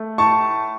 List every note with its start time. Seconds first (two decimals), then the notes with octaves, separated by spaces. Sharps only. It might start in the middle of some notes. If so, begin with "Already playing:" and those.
Already playing: A3
0.18 A2 A5 C#6